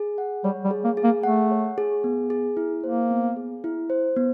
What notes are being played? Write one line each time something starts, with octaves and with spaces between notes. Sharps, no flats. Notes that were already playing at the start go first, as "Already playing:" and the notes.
Already playing: G#4
F#5
G3 C#5
G3
G#4
A#3
G#4
A#3
A3 F#5
C#5
G#4
B3
G#4
E4
A#3 C5
B3
G#4
E4
C5
B3